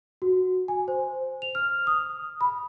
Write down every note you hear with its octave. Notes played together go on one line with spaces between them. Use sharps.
F#4
G#5
C5
F7
F6
D#6
B5